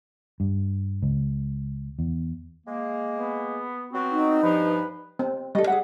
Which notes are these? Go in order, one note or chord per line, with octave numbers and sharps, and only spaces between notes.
G2
C#2
E2
G#3 A#3
B3
F#3 B3 C4 F#4
D#4
G2 F3 B4
C4
G3 A4 D#5
G#4 E5 F#5